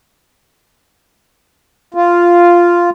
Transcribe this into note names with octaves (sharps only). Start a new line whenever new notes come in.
F4